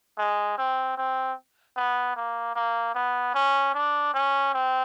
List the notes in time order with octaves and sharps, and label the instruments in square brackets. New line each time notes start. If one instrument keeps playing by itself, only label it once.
[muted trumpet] G#3
C4
C4
B3
A#3
A#3
B3
C#4
D4
C#4
C4